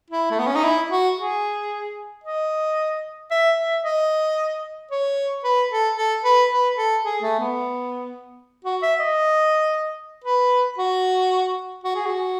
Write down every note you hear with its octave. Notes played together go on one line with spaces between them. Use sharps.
E4
A3
B3
C#4
D#4
E4
F#4
G#4
D#5
E5
E5
D#5
C#5
B4
A4
A4
B4
B4
A4
G#4
A3
B3
F#4
E5
D#5
B4
F#4
F#4
G#4
F#4